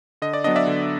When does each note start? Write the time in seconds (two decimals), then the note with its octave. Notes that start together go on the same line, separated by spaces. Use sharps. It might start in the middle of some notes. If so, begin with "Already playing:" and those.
0.22 D3 D#5
0.33 D5
0.44 F#3 B3 D4 D#5
0.56 D5 E5
0.67 D3